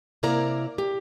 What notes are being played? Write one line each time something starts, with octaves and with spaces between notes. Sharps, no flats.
C3 A#3 E4 A#4 D5 A#5
G4